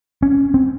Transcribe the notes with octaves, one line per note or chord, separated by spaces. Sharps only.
C#4
C4